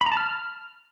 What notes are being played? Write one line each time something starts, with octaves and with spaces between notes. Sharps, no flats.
B5
A#5
A5
F6